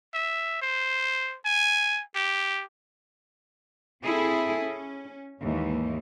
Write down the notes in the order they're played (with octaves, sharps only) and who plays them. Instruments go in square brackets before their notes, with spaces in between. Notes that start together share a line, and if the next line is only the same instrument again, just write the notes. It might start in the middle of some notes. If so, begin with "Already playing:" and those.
[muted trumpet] E5
C5
G#5
G4
[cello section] C4 E4 G#4 A4
C#4
D#2 G#2 E3